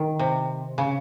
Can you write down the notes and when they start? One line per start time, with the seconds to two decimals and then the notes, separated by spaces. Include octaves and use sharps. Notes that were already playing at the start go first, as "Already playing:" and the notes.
Already playing: D#3
0.19 C3
0.78 C#3